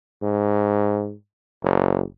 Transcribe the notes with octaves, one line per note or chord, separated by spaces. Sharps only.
G#2
F#1